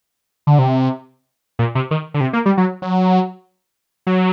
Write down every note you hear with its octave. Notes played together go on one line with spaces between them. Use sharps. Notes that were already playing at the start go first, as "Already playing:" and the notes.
D3
C3
A#2
C3
D#3
D3
C3
A#3
G3
F#3
F#3
F#3